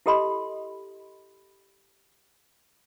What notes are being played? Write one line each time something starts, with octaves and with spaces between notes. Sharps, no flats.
E4 G4 A4 D#5 B5 C6